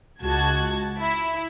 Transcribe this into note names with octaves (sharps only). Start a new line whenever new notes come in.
C#2 F#4 A5 G#6
E4